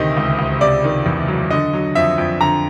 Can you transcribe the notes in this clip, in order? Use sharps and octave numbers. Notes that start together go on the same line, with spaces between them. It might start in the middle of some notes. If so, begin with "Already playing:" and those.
Already playing: D2 C3 D#3 D#5
C#2
C#2
C3 D5
D#3
E2
F#3
D3 D#5
F#3
F2 E5
F2
D3 A#5